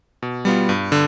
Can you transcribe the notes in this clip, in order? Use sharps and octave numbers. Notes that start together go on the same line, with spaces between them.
B2
G3 B3 F4
G2
D3